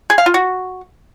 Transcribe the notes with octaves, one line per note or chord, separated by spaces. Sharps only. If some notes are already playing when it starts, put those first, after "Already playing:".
G#4
F5
F4
F#4